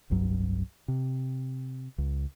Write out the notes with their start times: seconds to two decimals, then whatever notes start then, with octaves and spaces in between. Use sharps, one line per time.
0.10 F1 C2 G2 F#3
0.88 C3
1.98 C#2